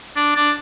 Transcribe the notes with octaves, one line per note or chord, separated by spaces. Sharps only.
D4
D4